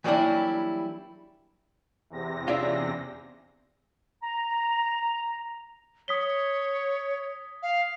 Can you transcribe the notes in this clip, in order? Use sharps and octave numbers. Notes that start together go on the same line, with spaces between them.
E3 F#3 G3 A#3 D4 E4
E2 C3 A#6
C#4 D4 F4 G#4 D5 E5
A#5
C#5 D#6 B6 G7
F5